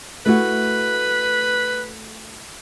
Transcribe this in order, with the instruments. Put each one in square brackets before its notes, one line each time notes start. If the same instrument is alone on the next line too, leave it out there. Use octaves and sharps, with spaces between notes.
[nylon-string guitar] A3 E4 F#4 [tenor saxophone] B4